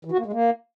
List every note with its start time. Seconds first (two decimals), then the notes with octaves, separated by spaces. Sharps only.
0.05 E3
0.12 F#4
0.19 A#3
0.26 G#3
0.33 A#3